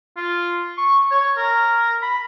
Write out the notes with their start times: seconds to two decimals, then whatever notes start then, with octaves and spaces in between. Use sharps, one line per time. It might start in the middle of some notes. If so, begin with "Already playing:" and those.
0.17 F4
0.78 C#6
1.11 C#5
1.37 A#4
2.02 B5